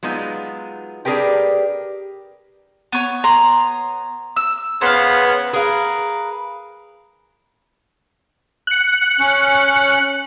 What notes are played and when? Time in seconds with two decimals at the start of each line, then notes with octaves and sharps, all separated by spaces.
0.03 F#3 G#3 B3 D#4 F4
1.05 D4 G4 G#4 A#4 B4 G5
2.92 B3 C#5
3.24 A#5 C6
4.36 E6
4.81 C#3 B3 C5 F5
5.53 G#4 A#4 B4 F5
8.67 F#6 C#7
9.19 C#4